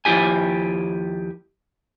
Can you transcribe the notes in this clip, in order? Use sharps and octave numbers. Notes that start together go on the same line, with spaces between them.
D#2 F3 D#4 E4 G4 G#5